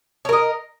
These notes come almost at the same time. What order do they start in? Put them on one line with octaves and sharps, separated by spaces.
C#5 A#4 D#5